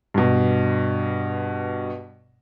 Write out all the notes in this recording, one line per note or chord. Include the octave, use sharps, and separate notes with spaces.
G2 B2